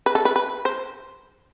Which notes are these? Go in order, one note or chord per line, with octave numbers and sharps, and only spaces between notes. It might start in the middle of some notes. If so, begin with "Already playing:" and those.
B4
A4
B4
B4
C5